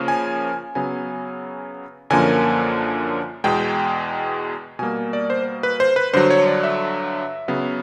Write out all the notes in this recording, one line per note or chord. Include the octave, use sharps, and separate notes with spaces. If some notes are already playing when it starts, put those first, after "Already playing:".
Already playing: C#3 F3 A#3 C#4
G#5
C#3 F#3 B3 G#5
F#2 D3 F3 A#3 C#4 G#5
E2 B2 G#3 G5
B2 G3 A#3 G#5
D5
C5
B4
C5
B4
G2 D3 F#3 C5
C#5
D5
E5
C#3 F#3 B3